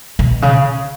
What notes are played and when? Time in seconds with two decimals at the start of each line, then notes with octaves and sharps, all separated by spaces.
0.19 B2
0.42 C#3